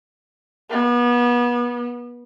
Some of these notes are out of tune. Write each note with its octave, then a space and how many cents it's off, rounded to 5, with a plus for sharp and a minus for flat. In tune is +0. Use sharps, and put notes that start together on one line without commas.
B3 -30